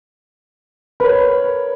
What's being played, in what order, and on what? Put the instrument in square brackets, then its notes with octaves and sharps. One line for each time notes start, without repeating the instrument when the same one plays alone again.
[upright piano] A#4 C#5 [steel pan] B4 B5